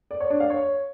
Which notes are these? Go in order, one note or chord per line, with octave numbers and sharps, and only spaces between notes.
D5
C#5
D4
F5
C#5